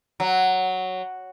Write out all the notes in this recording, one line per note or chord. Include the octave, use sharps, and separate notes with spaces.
F#3